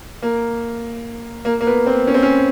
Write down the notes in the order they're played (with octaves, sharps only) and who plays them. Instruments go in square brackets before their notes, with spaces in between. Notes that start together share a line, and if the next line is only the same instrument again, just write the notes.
[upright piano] A#3
A#3
A#3
B3
C4
C#4
C4
C#4